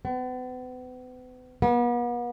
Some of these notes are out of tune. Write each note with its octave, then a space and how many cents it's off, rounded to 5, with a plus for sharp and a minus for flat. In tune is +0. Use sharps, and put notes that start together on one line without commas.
B3 +40
B3 -40